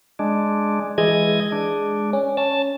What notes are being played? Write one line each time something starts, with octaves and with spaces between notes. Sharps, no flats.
G#3 D4
E3 G#3 D#5 G#6
D4
C#4
C#4 A5